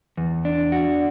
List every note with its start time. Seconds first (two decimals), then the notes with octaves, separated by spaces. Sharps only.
0.17 E2
0.45 D4
0.72 F#4